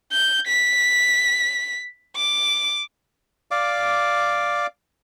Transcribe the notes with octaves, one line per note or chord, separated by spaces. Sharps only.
G6
B6
D6
D5 F5 D6